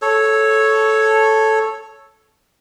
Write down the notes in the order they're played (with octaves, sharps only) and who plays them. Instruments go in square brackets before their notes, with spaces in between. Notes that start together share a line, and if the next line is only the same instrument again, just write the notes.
[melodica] A4 C#5